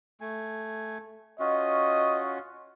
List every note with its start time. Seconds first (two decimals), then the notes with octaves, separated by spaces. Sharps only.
0.21 A3 G#5
1.40 C#4 F4 F#4 D#5